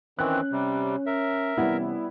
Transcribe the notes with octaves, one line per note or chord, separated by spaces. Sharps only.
D#3 E3 C4 C#4 F#6
C3 G3
A#4 E5
C3 E3 G3 B3 C#4 E4